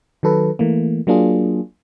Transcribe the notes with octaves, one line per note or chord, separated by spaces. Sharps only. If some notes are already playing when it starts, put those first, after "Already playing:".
D#3 F#3 A4 B4
E3 A3 A#3
F#3 A#3 D4 F4 G#4